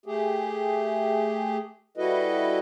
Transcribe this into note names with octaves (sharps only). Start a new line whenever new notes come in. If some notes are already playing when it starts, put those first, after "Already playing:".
A3 G4 G#4
G3 E4 F#4 A4 B4 D#5